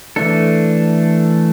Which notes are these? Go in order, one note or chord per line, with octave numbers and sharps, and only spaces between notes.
E3 A3 D4 A4